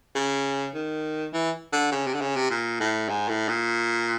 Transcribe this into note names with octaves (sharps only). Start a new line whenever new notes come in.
C#3
D#3
E3
D3
C#3
C3
D3
C#3
C3
A#2
A2
G#2
A2
A#2